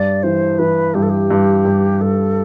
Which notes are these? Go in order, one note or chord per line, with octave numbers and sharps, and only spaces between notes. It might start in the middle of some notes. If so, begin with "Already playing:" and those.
Already playing: G2 D5
E3 C5
E3 B4
G2 G4
A4
G4
G2
G2
G2 A4